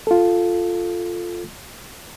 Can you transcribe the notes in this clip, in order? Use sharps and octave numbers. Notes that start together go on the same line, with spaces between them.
F4 A4